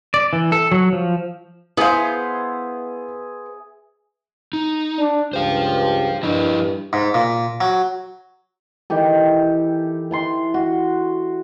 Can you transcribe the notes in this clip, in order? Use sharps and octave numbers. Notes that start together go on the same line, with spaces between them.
D5
E3
A4
F#3
F3
B3 E4 G#4 C5 E5 F5
D#4
D4
C#2 G2 G4 C5 F5
G2 F3 E4 D#5
G#2
A#2
F#3
D#3 E3 G4 A4
E3 A5 C6
F#4